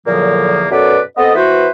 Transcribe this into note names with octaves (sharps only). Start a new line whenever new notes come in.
E2 A#2 D3 F3 F#3 A#3
F#2 B2 A4 B4 D5
B3 C4 A4 D#5
E3 B3 F#4 B4 C5